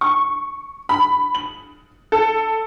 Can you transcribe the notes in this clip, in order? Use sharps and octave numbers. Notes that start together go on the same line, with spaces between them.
C#6
B5
F#7
A4